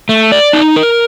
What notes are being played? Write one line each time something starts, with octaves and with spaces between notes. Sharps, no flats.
A3
D5
D#4
A#4